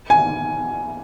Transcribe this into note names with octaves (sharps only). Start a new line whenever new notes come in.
G#5